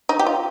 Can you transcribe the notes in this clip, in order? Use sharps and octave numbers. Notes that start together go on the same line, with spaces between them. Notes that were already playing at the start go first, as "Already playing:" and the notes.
D#4
G4
F4